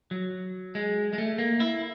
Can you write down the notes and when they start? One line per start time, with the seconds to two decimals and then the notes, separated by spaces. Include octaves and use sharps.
0.11 F#3
0.75 G#3
1.13 G#3
1.18 A3
1.38 A#3
1.60 E4